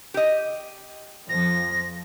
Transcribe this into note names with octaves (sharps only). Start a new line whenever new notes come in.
G4 D#5
F2 F3 A#6